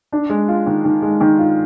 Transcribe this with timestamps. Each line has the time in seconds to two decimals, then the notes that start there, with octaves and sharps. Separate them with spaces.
0.12 D4
0.29 G#3
0.48 F4
0.66 D#3
0.85 D#3
1.02 G#3
1.21 D#3
1.39 F4